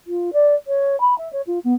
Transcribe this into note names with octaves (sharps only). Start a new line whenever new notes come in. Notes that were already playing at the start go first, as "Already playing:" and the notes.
F4
D5
C#5
B5
E5
C#5
F4
B3